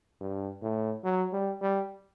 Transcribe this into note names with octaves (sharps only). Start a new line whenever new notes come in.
G2
A2
F#3
G3
G3